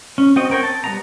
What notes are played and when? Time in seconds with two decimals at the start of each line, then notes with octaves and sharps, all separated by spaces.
0.18 C#4
0.36 C4 F#4 D#5
0.50 C4 A#4 C#5 G5
0.63 A5
0.84 G3 B3 A#5